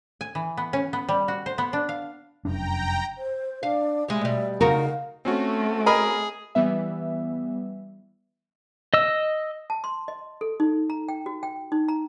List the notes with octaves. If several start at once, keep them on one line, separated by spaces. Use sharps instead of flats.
G#5
E3
B3
C#4
B3
G3
F#4
C5
B3
D4
F5
F1 F#2 D4 G5 A#5
C5
D4 F5
G3 G#3 E5
B2 G3
C#3 D#4 F#4 A#4 F5
A3 C4 C#4 F#4
G#4 A#4 D#5 B5
E3 G3 B3 E5
D#5 E6
A5
C6
D#5
A4
D#4
A#5
G5
F#4
G5
D#4
A#5